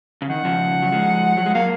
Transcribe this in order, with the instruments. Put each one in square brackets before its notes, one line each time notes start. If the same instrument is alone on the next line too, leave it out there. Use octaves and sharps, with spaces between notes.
[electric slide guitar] C#3
[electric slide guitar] D#3 [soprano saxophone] F#5
[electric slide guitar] C#3 F3
F#3
F3 G#3
F#3
G#3
[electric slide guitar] F#3 A#3 [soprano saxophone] F5